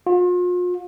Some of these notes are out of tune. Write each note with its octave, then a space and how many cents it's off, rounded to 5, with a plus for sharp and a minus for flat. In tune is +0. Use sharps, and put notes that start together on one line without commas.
F4 +40